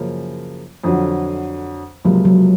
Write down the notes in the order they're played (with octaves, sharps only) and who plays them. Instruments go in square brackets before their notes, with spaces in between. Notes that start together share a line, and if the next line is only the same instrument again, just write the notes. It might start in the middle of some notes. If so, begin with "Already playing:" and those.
Already playing: [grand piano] F#2 C#3 F3 A#3
F2 D3 F#3
[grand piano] C#2 C3 F3 A#3 [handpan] F#3
[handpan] F#3